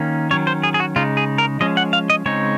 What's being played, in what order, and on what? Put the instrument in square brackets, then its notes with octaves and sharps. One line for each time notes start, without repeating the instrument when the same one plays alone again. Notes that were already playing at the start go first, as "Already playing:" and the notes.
Already playing: [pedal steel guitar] D#3 A#3 C#4
D#3 F#3 C#4 C#5
C5
G#4
G#4
F#4
C#3 G#3 D#4 F4
G#4
A#4
F3 G#3 C#4 D#5
F#5
F5
D#5
C#3 G#3 C4 D#4 C#5